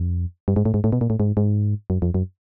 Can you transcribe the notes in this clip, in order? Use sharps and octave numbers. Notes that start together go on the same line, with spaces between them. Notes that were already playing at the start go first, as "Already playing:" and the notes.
Already playing: F2
G2
G#2
A2
G#2
A2
B2
A#2
A2
G#2
G#2
F#2
F2
F#2